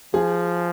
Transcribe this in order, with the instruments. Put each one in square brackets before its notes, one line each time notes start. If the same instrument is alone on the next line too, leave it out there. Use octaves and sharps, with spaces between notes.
[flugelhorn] F3 [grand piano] G#4